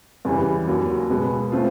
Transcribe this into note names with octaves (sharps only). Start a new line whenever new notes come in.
E2 C#3 E3 G3
D#2 C#3 F#3
B2 G#3 B3
A3 C4 F4